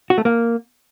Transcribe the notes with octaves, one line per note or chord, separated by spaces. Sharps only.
F#4
A3
A#3